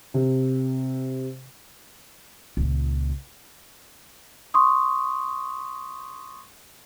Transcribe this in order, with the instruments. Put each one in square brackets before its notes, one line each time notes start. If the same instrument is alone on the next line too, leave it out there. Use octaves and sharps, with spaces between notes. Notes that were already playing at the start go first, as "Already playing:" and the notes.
[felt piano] C3
[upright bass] C#2 A#2
[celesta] C6 C#6 D#6